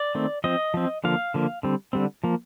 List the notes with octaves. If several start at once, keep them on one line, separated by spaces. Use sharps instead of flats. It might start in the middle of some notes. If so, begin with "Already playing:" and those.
Already playing: D5
D#3 A3 C4
F3 C4 D#5
F3 C4
D3 F3 A#3 F5
D3 F3 A#3
D3 G3 C4
D3 G3 C4
F3 A#3